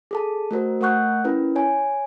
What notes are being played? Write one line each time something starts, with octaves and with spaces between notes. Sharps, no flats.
G#4 A4 A5
A3 F#4 A#4 C5
A3 A#4 F#5 C#6 F#6 G6
C#4 E4 A#4 B4
C#5 G#5